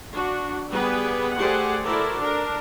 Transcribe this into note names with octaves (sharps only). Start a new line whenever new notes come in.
D4 F#4
G3 B3 G#4 B4
A3 G4 G#4 C5 D5 F#5
E4 F#4 A4 A#4 C5 D5
D4 A#4